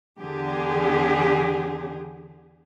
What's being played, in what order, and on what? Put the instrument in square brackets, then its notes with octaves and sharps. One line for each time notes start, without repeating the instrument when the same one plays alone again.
[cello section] E2 D3 G4 G#4